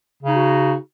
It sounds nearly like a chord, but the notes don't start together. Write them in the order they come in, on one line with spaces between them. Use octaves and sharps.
C#3 D#4 F#4